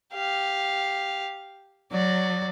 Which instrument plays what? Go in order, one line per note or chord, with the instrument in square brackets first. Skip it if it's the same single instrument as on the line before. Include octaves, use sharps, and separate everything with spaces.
[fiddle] G4 F5
[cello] F#3 [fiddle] D5